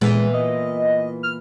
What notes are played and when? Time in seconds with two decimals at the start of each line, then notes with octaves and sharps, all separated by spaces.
0.01 A#2 E3 G#3 B3
0.34 D#5
1.23 F6